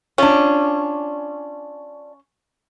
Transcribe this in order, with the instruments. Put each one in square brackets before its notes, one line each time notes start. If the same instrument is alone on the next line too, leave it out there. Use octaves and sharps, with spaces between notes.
[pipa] C#4 [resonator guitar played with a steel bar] D4 F4